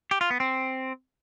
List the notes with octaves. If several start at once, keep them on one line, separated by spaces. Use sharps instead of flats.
G4
F4
B3
C4